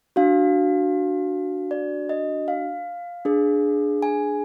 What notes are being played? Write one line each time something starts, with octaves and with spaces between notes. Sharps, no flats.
D4 F#4 F5
D5
D#5
F5
D4 G#4
G#5